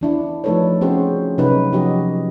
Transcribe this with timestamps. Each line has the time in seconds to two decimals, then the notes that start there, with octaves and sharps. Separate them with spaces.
0.01 E3 D4 E4
0.44 F3 A3 D#4 A4 B4 C#5
0.81 C4 C#4 F#4 G#4 C5
1.38 C3 F#3 C#4 D#4 B4
1.72 F3 D#4 F#4 G4 D#5